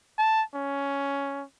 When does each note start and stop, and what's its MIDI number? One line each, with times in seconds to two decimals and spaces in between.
0.18 0.43 81
0.55 1.44 61